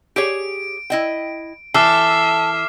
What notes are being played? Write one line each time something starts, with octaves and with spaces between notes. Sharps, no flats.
G4 G#4 C#5 D7
E4 D#5 G5
E3 A4 E5 D6 F6 C7